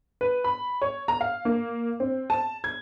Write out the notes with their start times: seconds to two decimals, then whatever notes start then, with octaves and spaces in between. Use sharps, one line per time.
0.21 B4
0.44 B5
0.82 C#5
1.08 A#5
1.21 F5
1.45 A#3
2.00 C4
2.30 A5
2.64 G#6